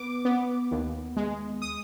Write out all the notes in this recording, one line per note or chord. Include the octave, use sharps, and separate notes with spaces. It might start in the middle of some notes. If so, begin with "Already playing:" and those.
Already playing: B3 D6
B3
D#2
G#3
D#6